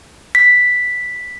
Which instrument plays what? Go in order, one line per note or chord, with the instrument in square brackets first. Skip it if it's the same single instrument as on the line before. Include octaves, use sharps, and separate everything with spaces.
[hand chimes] B6